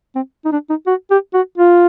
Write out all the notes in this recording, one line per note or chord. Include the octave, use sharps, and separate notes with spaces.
C4
D#4
D4
D#4
F#4
G4
F#4
F4